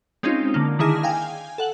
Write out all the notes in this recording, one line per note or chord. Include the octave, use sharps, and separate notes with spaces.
G#3 C4 C#4 D#4 F4
D3 A#3
D3 D#3 E4 G#4 F6 A#6
F5 G5 G#5
A4 F#5 F#7